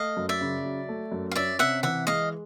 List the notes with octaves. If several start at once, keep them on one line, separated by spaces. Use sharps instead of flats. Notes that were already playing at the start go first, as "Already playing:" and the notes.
Already playing: A3 D#5 F5
F#2
D5 E5
C#3
F#3
A3
F#2
F5
C#4 D5 E5
C3 E5 F#5
E3 E5 F#5
G#3 D#5 F5